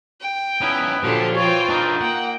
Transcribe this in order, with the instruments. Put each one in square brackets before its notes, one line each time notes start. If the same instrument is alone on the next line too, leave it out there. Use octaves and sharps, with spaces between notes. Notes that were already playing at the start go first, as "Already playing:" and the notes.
[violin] G5
[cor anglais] B3 [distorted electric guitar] C#4 D#4 [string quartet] E4
[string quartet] A#2 D3 F#3 [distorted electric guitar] F3 [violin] G4 A5
[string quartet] E3 F4 [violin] C5 G5 [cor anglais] C#5
[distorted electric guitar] D4 A#4 [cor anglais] D#4
[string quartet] A#3 [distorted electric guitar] F#5 [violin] G5